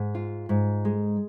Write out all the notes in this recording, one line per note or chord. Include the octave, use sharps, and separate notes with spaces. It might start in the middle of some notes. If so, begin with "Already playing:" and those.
Already playing: G#2
F4
G#2
G#3